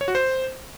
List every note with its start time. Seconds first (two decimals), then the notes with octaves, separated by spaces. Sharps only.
0.01 C#5
0.08 F#4
0.15 C5